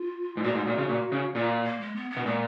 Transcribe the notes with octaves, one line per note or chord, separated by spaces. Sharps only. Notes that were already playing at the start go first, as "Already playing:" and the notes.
Already playing: F4
G#2
A#2 F#4
G#2
A#2
C#3
A#2
C#3
A#2 F4
A#3
G#3
B3
B3
B2
A#2 G#3